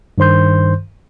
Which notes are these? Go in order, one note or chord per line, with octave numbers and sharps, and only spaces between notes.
G2 D#3 C5 C6 G6